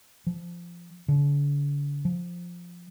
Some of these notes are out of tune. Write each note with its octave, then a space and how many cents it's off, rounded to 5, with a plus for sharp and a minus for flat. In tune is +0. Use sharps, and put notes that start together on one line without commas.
F3 -15
D3 -40
F3 +5